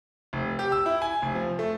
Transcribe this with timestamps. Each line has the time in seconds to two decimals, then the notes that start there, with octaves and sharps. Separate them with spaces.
0.33 F1
0.59 G4
0.72 E6
0.86 E4
1.02 G#5
1.22 F1
1.35 F3
1.59 A3